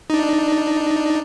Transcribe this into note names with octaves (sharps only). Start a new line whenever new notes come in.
D4 D#4